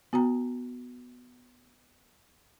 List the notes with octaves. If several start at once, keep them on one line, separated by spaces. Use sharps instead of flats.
B3 F#4 G5 A#5